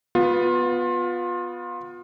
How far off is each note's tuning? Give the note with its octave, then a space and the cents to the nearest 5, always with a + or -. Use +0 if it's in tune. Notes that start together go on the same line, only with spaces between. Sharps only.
B3 +0 F4 +25